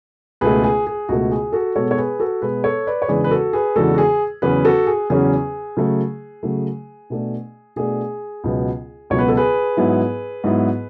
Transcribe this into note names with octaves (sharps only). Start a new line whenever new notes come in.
C#2 B2 A3 G#4 B4
G#4
G#4
C#2 B2 A3 F#4
G#4
F#4 A4
B2 G#3 B3 A4 C#5
C#5
G#4 B4
F#4 A4
B2 G#3 B3 G#4 B4
A4 C#5
B4 D5
C#5
E2 C#3 E3 G#3 D4 G#4 B4
B4
F#4 A4
G#4 B4
E2 C#3 E3 G#3 D4 F#4 A4
F#4
G#4
E2 C#3 F#3 C#4 G#4 B4
F#4 A4
G#4
E2 C#3 F#3 C#4 G#4
C#3 F#3 A3
C#3 F#3 A3
B2 A3 D4
B2 A3 D4 G#4
C#2 B2 F#3 B3
C#2 B2 F#3 B3 C#5
B4
A4
G#4 B4
G#2 F#3 B3 E4
G#2 F#3 B3 E4